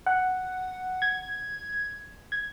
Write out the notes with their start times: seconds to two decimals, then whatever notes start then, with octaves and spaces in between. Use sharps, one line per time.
0.06 F#5
1.02 G#6
2.32 G#6